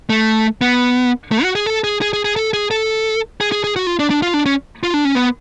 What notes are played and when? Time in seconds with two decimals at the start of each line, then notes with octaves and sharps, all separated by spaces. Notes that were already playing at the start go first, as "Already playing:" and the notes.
0.10 A3
0.61 B3
1.31 A3
1.43 F#4
1.55 G#4
1.66 A4
1.84 G#4
2.02 G#4
2.13 G#4
2.25 G#4
2.36 A4
2.53 G#4
2.71 A4
3.41 G#4
3.52 G#4
3.64 G#4
3.76 F#4
3.87 F4
3.99 D4
4.10 D4
4.22 F4
4.34 D4
4.46 C#4
4.83 F4
4.94 D4
5.05 C#4
5.15 B3